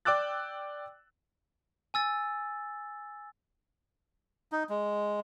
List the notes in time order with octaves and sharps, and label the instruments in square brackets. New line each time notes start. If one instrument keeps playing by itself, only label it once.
[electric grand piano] D5 G5 D6 E6 F#6 A6
[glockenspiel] G#5 E6 A6
[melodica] D#4
G#3